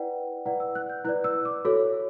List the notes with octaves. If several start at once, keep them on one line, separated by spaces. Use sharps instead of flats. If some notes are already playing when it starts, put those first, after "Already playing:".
Already playing: E4 B4 D5 F#5 G5
E4 B4 D5 F#5
E6
F#6
G6
E4 B4 D5 F#6
E6
D6
F#4 A4 C#5